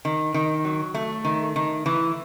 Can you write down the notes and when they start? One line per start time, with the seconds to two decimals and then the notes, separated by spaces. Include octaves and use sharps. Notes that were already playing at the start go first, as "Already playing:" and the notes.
0.05 D#3
0.34 D#3
0.65 F#3
0.94 A3
1.25 D#3
1.56 D#3
1.86 E3